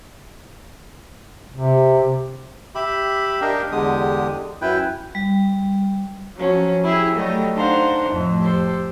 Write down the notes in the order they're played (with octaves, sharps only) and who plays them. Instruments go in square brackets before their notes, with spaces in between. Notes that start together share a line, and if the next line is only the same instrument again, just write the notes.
[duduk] C3
[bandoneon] G4 E5 B5
D4 G4 A#4 D#5 F5 G5
E2 D3 G#3 G4 D#6
F#2 E4 B4 G5
[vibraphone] G3
[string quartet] F3 F#3 C#4
E4 G4 G#4
F#3 G3 A3 D#5
D4 D#4 C5 F5 F#5
F2 A2
G4 A4 C5